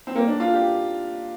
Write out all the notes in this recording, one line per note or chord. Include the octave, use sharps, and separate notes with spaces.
C4
A#3
D4
F4
G4